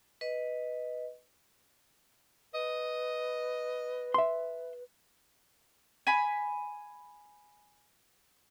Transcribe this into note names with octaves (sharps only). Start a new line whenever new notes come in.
B4 D#5
B4 D#5
E5 C6
G#5 B5